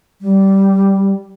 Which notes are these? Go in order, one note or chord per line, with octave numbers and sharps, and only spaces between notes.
G3